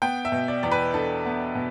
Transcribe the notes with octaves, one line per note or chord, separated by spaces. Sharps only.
B3 G5
E5
B2
D5
E2 D5
B4
D4 A4
B3
B2